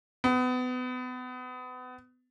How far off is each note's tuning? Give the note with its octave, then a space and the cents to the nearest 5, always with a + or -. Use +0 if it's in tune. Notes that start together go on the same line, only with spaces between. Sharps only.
B3 +30